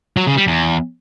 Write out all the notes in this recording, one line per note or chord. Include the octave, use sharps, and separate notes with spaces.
F#3
C#3
G3
E2